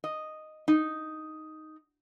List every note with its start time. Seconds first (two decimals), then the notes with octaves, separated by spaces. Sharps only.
0.04 D#5
0.68 D#4